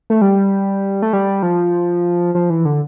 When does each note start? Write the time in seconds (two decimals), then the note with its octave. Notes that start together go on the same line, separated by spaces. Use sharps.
0.10 A3
0.21 G3
1.02 A3
1.13 G3
1.43 F3
2.35 F3
2.50 E3
2.65 D3